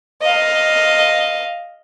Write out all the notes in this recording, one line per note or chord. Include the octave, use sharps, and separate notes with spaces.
D#5 F5